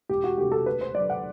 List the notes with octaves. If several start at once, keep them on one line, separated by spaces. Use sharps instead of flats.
E1 G4
F#4
D2 C3 G4
A4
D2 B4
C5
D3 F#3 D5
F#5